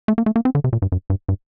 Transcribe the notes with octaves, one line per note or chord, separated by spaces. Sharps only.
A3
A#3
A3
A#3
C4
D3
C3
A#2
G2
F#2
G2
G2